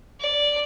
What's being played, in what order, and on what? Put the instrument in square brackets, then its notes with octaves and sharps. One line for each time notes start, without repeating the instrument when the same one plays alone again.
[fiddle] D5